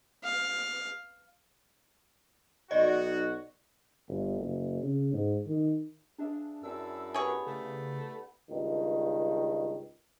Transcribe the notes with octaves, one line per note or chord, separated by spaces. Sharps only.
F5
B1 D#4 F#4 D5 D#5
G1
F#1
C#3
G#2
D#3
D4 G#4 E5 F5
F#2 D4 E4 G#4 E6
B3 G4 G#4 C#5 B5
C#3 A3
C#2 G2 D#3